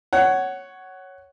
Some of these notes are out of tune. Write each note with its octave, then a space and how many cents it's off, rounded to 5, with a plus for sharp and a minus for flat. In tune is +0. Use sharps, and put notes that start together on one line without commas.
C#5 +0 F#5 +15